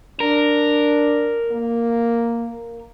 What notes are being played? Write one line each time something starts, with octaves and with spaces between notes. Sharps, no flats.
D4 A#4
A#3